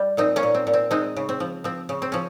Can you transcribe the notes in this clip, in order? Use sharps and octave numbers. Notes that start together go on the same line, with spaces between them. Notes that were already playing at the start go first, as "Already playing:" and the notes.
Already playing: G3
A#2 C4 D#4
A#3 C#4
A#2
C4
A#2
C4
G#3 C4 D#4
C#3
C4
F3
F3 C4
C#3
C4
F3 C#4